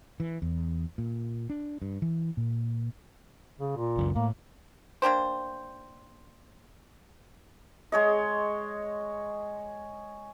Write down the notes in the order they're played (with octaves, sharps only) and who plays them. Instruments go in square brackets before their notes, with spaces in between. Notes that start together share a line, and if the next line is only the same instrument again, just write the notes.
[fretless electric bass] E3
E2
A#2
D4
G2
E3
A#2
[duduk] C#3
A#2
[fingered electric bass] F#1 C#2 F#2
[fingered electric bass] A2 [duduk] A#3
[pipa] A#3 D4 G4 C5
[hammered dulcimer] G#3 C#5 D#5